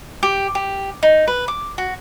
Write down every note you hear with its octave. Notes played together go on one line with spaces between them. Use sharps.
G4
G4
D#4
B4
D6
F#4